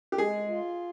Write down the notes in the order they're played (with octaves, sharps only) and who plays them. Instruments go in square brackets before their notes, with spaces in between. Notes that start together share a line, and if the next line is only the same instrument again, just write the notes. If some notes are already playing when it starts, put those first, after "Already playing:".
[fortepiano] G4
[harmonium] G#3 [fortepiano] G#4
[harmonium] F4